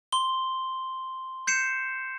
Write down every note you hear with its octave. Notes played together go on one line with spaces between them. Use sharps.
C6 G7
G6 C7 C#7 E7